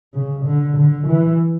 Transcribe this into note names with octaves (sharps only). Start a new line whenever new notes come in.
C#3
D3
D3
E3